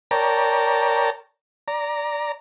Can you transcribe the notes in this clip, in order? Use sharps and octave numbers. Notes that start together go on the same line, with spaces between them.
A#4 C#5 D5 G5 A5 A#5
D5 A#5